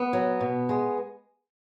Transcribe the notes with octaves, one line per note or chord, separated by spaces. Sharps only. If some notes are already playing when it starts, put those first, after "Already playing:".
Already playing: B3
F#3
B2
G#3